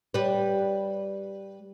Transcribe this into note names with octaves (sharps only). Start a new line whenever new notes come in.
G3 B4